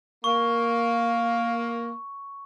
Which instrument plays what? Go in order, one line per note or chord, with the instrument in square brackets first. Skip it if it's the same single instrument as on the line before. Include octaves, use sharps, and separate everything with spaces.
[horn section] A#3 [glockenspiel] C#6